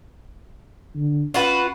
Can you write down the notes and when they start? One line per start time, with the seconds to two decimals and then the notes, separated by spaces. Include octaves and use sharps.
0.95 D3
1.34 C#4 F4 F#4 B4